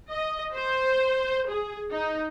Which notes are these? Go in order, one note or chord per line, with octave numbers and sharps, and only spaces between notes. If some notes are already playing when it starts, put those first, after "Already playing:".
D#5
C5
G#4
D#4